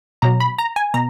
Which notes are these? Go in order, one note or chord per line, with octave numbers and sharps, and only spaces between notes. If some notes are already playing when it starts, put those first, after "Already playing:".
B2 F#3 A#5
B5
A#5
G#5
B2 A#5